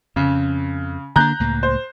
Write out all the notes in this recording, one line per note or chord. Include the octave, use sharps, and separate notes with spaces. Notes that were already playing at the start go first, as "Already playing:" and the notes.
F2 C#3
D3 A#3 D4 A#5 F#6 G6
C#2 A2 A#3
C5